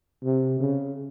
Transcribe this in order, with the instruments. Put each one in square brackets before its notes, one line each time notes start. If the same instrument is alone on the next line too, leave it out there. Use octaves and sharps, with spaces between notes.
[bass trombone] C3
C#3